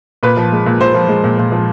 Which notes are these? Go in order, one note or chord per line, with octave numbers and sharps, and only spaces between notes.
A#2 B4
F3
G#3
A#2
A#2 C5
F3
G#3
A#2
A#2
F3